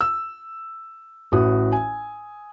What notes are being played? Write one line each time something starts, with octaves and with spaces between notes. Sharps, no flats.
E6
A1 A2 F#4 D#6
G#5